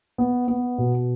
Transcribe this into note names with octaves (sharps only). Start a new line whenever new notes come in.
B3
B3
B2